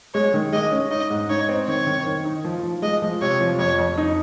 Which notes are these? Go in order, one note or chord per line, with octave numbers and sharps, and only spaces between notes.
G#3 C#5
D#3
G#3 D#5
C#4
D#4 D#5
G#2
D#4 C#5
C4
D#3 C#5
D#3
D#3
D#4
F3
F3
G#3 D#5
F3
C3 C#5
F3
F2 C#5
F2
D#4